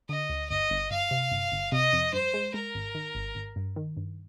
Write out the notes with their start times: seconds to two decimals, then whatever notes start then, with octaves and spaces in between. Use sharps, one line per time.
0.09 D3 D#5
0.29 D2
0.49 G1 D#5
0.70 G1
0.90 G1 F5
1.11 C3
1.31 G1
1.52 G1
1.72 C3 D#5
1.93 F2
2.13 G2 C5
2.34 G#3
2.54 G#3 A#4
2.75 G#1
2.95 D#3
3.15 G#1
3.35 G#1
3.56 G2
3.76 D#3
3.97 G2